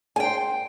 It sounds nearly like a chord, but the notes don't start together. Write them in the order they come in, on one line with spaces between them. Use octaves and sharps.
G#5 G5 C5